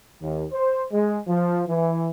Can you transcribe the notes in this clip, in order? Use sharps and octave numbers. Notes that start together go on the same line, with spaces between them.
D#2
C5
G#3
F3
E3